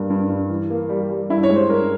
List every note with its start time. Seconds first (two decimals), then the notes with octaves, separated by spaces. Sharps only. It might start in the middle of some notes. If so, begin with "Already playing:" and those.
Already playing: G2 A#3
0.10 G2
0.29 G2
0.49 E3
0.70 A#3
0.89 G3
1.10 G3
1.30 G2 E4
1.43 C#5
1.49 G#3
1.56 C5
1.70 G2 A#4